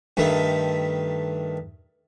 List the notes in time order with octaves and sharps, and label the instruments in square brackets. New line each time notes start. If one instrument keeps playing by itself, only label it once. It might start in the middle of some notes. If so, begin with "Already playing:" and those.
[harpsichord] G2 D#3 A3